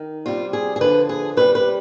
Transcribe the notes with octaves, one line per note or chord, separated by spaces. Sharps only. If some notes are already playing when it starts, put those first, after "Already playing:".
Already playing: D#3
C3 G3 F4
G#4
G#4
D3 F3 B4
G#4
C3 G3 B4
B4